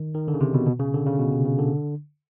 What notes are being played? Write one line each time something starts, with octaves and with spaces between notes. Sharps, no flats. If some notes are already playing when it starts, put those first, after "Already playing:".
Already playing: D#3
D#3
D3
C#3
C3
B2
B2
C#3
D3
C#3
B2
C3
C#3
D3